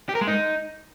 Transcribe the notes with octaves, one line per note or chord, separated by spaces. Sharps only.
G4
A#4
G#3
D#4